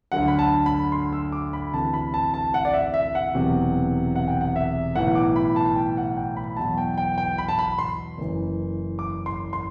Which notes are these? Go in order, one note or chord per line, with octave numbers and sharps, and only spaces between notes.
D2 D3 F#3 F#5
B5
A5
B5
C6
E6
D6
B5
D2 C3 E3 A5
B5
A5
A5
F#5
D5
E5
E5
F#5
E1 E2 C3 F#3
F#5
G5
F#5
E5
B1 A2 E3 F#5
D6
B5
A5
G5
F#5
G5
B5
E2 B2 F#3 A5
G5
G5
G5
B5
A5
B5
C6
F#1 F#2 E3
D6
C6
C6